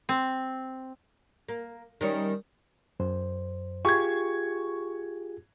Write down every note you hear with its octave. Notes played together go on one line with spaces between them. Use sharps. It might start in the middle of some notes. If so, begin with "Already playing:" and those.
C4
A#3
D#3 G3 C#4
F#2 C5
F4 G4 G#4 C#6 G#6